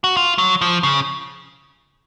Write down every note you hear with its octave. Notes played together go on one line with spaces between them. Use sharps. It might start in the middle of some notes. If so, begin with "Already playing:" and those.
F#4
F4
F#3
F3
C#3